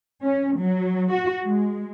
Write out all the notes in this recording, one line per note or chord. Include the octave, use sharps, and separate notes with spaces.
C#4
F#3
F#4
G#3